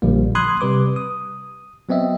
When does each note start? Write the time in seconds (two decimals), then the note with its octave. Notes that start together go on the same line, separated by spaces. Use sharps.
0.02 A#1 D3 F3 G3 A#3
0.35 B5 C6 D#6 F#6 G#6
0.61 C3 G3 B4 D6
0.96 D#6
1.89 F#3 B3 C4 D#5 E5